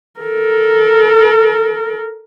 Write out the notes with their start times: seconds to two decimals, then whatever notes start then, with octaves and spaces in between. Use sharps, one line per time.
0.20 A4 A#4